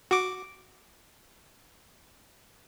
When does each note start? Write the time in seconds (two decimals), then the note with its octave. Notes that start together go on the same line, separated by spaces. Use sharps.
0.11 F#4 D6